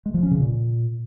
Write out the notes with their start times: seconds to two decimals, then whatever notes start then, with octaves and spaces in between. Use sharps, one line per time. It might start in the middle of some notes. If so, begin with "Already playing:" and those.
0.06 G#3
0.14 F3
0.23 C#4
0.31 C#3
0.40 A#2